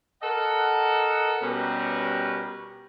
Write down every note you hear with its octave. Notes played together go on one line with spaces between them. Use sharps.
A4 A#4 D#5 F#5
B2 G3 C#4 G4 A#4 B4